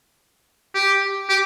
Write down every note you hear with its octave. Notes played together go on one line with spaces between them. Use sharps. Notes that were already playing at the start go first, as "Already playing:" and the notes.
G4
G4